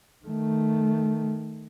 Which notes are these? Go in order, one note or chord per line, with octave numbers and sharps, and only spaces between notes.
D#3 A3